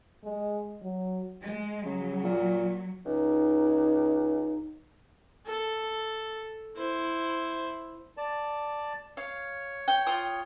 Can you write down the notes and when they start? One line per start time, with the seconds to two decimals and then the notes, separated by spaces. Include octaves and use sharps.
0.24 G#3
0.82 F#3
1.42 G#3
1.85 C#3 F#3
2.24 A#2
3.05 C#2 D#4
5.46 A4
6.76 E4 C5
8.17 D5 A5
9.17 C#5 F5
9.88 G5
10.07 F4 G5 D#6